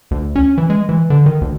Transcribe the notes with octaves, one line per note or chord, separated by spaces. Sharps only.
D2
C#4
E3
G#3
E3
D3
D#3
D2